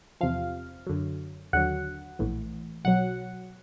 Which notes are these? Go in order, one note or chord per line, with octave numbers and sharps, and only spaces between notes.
E2 C3 F3 F5
F#2 D3 F#3
D#2 D3 F#3 F#5
A#1 A2 E3
B1 B2 F#3 F#5